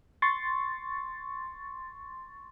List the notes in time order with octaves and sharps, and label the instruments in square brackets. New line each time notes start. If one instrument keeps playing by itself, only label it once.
[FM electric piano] C6 C#6 A6